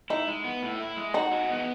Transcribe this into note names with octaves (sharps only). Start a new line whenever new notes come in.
D#4 E4
G#3
B3
A2
E4
G#3
D#4 F#4
G#3
B3